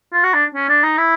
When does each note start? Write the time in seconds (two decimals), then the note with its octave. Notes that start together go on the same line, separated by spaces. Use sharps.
0.13 F4
0.24 F#4
0.34 D4
0.55 C#4
0.69 D4
0.84 D#4
0.98 E4